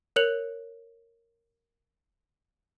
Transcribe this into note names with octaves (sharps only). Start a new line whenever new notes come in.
A#4 C#5 F#6 C#7 F7 F#7